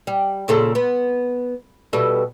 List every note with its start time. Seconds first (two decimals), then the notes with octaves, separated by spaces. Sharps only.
0.07 G3
0.48 A#2 C#3 A4
0.75 B3
1.93 B2 G3 A4